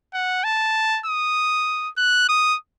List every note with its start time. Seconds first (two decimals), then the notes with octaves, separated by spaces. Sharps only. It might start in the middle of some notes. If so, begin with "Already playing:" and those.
0.13 F#5
0.44 A5
1.06 D#6
1.97 F#6
2.29 D#6